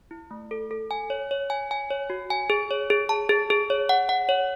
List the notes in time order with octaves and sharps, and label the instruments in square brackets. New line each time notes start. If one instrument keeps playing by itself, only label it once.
[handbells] E4
A3
A4
A4
G#5
C#5
C#5
G#5
G#5
C#5
F#4
G#5
G#4
C#5
G#4
A5
G#4
G#4
C#5
F#5
F#5
C#5